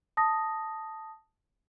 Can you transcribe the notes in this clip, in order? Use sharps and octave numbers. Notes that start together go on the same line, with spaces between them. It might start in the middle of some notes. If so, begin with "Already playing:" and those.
A5 D#6 A#6